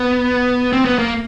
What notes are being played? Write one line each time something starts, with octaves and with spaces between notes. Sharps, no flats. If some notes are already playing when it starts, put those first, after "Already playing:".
Already playing: B3
C4
B3
A#3